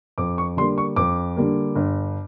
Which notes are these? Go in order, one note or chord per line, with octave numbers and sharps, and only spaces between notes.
F2 D6
C#6
D3 G3 A#3 C6
C#6
F2 D6
D3 G3 A#3
G1